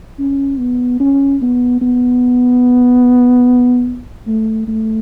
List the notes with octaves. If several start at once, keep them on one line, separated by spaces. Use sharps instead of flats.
C#4
B3
C#4
B3
B3
A3
A3